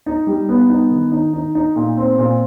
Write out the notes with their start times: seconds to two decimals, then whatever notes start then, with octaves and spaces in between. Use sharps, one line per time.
0.06 D#4
0.27 G3
0.49 B3
0.69 D#4
0.91 D#3
1.12 D#4
1.33 D#4
1.55 D#4
1.76 A#2
1.97 C4
2.18 A#2